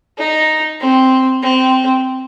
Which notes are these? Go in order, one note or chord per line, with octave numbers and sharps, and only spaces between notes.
D#4
C4
C4